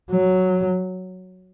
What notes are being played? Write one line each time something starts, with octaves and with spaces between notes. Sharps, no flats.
F#3